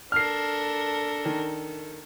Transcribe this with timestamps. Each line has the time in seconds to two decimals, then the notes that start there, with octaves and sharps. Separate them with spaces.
0.12 D4 A4 A#4 F6 C7
1.25 D#3